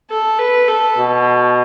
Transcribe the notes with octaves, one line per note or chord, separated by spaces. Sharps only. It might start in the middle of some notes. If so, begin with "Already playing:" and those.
A4
B4
A4
B2